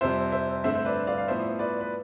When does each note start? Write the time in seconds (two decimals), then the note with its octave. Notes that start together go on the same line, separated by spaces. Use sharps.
0.01 F2 C3 G3 C5 E5
0.32 C5 E5
0.64 G2 D3 A3 C4 C5 E5
0.75 C5
0.85 B4 D5
1.07 D5 F5
1.18 F5
1.28 A2 F3 B3 C5 E5
1.59 B4 D5
1.80 B4